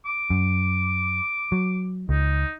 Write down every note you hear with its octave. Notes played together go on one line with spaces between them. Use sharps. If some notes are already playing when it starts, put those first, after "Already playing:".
D6
F#2
F#3
C#2 D#4